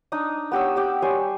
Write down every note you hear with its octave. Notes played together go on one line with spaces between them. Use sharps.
D4 D#4 D#6
B3 G4 C#5 E6
G4 D5 G5
G3 C#5 G#5 C6